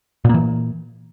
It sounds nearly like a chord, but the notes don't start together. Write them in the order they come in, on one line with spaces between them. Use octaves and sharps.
A#2 A#3 E3